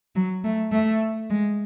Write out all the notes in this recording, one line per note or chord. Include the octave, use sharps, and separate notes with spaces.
F#3
A3
A3
G#3